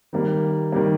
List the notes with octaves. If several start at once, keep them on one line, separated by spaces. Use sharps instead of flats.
D#3 G3 A#3
D#3 G3 A#3